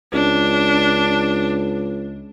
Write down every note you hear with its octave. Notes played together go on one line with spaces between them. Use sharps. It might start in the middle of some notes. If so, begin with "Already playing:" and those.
C#2 D4